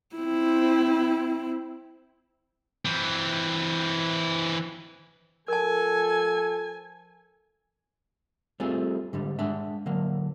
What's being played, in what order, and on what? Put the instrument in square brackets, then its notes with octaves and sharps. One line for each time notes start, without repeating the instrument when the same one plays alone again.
[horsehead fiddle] C4 E4
[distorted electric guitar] E3 C4
[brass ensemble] F3 A4 [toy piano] A#4 A5 [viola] G#5
[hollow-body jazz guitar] G3 A3 C4 F4 G#4
G#2 D3 G3
G#3 D4 E5
D3 F#3 A#3